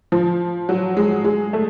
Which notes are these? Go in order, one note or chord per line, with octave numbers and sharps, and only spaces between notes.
F3
F#3
G#3
G#3
A3